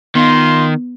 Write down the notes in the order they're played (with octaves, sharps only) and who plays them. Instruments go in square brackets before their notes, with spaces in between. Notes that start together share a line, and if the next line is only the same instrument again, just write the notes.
[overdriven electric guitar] D#3 [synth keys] B3 [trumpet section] F4 C6